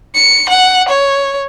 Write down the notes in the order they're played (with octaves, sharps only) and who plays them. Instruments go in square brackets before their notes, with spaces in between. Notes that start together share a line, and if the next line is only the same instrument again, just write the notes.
[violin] C#7
F#5
C#5